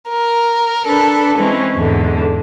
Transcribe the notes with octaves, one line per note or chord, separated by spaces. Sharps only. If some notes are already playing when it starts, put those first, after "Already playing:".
A#4
D4 A4 B4 B5
E3 G#3 C4 C#4
E2 G#2 D3